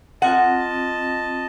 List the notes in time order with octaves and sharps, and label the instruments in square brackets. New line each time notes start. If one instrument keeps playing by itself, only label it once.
[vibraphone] C4 F4 [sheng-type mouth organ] D#5 A5 [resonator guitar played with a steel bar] F#5